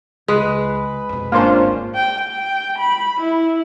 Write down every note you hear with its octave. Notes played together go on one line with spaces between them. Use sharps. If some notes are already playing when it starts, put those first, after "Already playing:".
C#2 G#3 B4
F2 B2
D1 G#1 A#3 C#4 D4 F4 C5
G5
G5
B5
E4